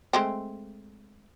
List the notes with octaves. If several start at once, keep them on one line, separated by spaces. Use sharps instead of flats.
G#3 A3 C4